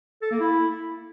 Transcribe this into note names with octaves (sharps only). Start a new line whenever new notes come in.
A4
A#3
E4